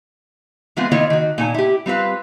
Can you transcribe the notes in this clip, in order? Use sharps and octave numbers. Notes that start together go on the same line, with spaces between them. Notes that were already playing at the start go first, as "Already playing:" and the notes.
E3 G#3 B3 C4 F4
D#3 A#3 E4 F4 C#5 D#5
D#3 F#4
A#2 D#4 G#5
E4 G4
G3 C4 F4 B4 F5